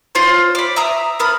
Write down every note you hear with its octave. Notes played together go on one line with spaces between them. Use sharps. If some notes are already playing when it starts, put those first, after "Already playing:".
F4 C5 C#5 C6
D5 B5
E5 A#5 D#6
B3 A#4 B5 D#6